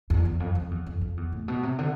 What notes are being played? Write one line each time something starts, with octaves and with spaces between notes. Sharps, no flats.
E2
E2
F2
F2
E2
F2
F2
E2
A2
B2
C3
D3